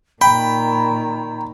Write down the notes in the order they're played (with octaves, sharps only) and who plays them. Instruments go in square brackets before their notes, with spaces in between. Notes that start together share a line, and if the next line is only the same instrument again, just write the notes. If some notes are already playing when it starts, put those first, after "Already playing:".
[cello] A#2 D#3 [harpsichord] G5 [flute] A#5 [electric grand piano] B5